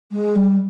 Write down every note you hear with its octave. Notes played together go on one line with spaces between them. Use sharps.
G#3
G3